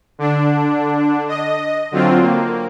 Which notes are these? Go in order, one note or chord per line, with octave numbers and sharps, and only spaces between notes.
D3 D4
D#5
D3 F#3 C4 F4
A#3